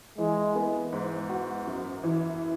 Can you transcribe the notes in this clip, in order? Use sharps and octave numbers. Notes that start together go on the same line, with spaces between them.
E3 G#3
B3
G#2
F#4
F#2
E3